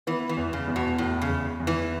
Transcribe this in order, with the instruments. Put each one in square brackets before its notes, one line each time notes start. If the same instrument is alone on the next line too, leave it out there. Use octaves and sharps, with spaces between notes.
[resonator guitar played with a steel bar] E3 [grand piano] B3
[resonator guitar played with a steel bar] E3
[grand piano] E2
[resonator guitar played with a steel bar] C#3
[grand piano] E2
[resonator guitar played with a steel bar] B2
[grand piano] E2 [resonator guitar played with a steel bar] A2
[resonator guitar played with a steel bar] C#3
[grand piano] E2
E2
[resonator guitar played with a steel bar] E3